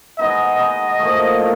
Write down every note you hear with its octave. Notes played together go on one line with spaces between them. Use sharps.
G#3 B3 D#4 D#5
G#3 B3 D#4
A#2 F3 A3
A#2 A3